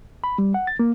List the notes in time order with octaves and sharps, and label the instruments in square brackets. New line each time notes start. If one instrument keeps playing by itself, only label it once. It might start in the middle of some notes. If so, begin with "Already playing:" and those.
[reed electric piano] B5
G3
F#5
A6
A#3